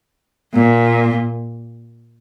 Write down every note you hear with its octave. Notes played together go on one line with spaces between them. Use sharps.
A#2